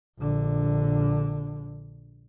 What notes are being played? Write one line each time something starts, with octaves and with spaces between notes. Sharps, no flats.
A#1 D3